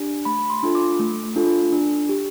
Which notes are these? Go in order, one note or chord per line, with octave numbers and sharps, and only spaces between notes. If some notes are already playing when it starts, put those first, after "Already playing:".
Already playing: D4 G4
A3 B5
C6
D4 F4 A4
D6
A3
D4 F4 A4
D4
G4